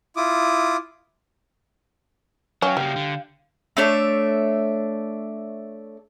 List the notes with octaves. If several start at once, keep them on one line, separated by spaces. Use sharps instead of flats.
E4 F4 D6 D#6
F#3 C#4 F5 G5
C#3 G3 A#3 G6
D3
A3 D4 C#5 E5